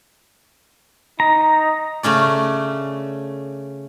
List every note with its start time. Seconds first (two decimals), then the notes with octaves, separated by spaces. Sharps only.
1.20 D#4 A#5
2.03 C#3 A3 C#4 D5